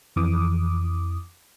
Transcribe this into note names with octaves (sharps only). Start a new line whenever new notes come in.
F2 E3 D6 D#6